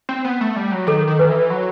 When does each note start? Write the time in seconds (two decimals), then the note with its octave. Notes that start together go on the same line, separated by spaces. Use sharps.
0.09 C4
0.25 B3
0.41 A3
0.56 G3
0.72 F#3
0.87 D#3 A4
1.08 D#3
1.19 B4
1.29 E3
1.50 F#3